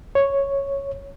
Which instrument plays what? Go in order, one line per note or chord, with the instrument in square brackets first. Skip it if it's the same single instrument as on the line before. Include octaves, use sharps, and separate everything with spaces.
[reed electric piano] C#5